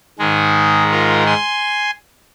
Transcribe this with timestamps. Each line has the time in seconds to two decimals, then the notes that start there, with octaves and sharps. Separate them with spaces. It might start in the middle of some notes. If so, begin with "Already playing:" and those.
0.19 G#2 D#3 G#3 G#4
0.91 F4 A#4
1.26 G#5 C6